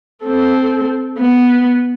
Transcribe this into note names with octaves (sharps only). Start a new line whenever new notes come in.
C4 A4
B3